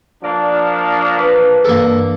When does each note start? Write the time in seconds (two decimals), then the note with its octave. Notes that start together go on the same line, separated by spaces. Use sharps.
0.24 F3 A#3 D4 D5
1.17 B4
1.65 G2 E3 G#3 A#3 A4